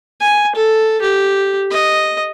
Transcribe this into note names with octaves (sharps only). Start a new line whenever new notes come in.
G#5
A4
G4
D#5